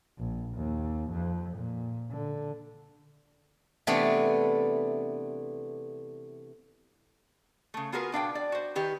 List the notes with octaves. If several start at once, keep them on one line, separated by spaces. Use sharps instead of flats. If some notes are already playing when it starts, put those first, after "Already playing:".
A#1
D#2
F2
A#2
D3
C3 E3 A3 B3 D4
C#3 A3
B3 F4 F#4 G#4 A#4 B4
B2 D4 F5 G5
D5
F#4 C5
D#3 G4 B4